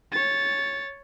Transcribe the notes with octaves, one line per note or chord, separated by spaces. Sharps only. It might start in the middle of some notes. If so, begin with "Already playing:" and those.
C#5 A6